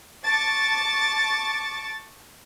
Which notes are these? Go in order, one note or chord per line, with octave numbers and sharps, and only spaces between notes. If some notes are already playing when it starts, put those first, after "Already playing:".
A5 C#6 D6 A6